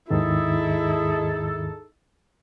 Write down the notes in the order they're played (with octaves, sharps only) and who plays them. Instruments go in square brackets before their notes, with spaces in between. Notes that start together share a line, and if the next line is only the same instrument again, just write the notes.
[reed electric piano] D#2 G#2 D#3 [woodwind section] D#4 G#4 A4 [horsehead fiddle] E4